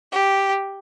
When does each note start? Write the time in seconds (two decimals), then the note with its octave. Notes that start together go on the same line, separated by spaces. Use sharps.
0.11 G4